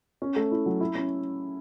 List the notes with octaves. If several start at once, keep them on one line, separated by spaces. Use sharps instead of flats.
C#4
A3
E4
F#3
E4
C#4